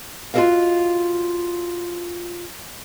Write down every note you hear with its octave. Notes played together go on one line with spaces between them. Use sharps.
F4 F#4 A4 A#4 D#5 F5